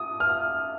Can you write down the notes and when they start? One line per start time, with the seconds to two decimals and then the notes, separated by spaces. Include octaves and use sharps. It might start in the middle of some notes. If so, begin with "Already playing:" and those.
Already playing: D#6
0.20 F6